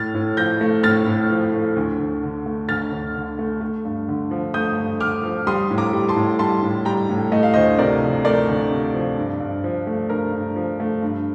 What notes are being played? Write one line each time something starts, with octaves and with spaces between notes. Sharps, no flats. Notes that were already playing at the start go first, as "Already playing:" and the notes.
Already playing: A2 F6 A6
A2
F3 G6 A#6
A3
A2 F6 A6
A2
F3
A3
D2
D2
D3
A3
D2 F6 A6
D2
D3
A3
A3
G2
D3
F3
A3 D#6 G6
G2
D3 D6 F6
F3
G3 C6 D#6
A2
A#5 D6
G3
A5 C6
A2
G3 A5 C6
A2
G3 G5 A#5
A2
A3 D#5
F5
D2 C5 D#5
C3 A#4 D5
F3
A3 A#4 D5
D2
C3
F3
G2
G2
F3
A3
G2 A#4
G2
F3
A3
G2